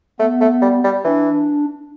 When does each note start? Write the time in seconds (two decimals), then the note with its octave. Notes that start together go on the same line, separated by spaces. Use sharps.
0.19 A3 B3
0.41 A3
0.62 G3
0.84 G3
1.04 E3 D4